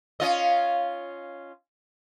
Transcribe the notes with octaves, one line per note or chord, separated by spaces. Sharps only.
C#4 F4 D#5